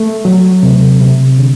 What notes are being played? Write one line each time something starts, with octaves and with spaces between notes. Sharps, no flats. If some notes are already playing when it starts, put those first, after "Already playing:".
Already playing: A3
F#3
C3
C3
D3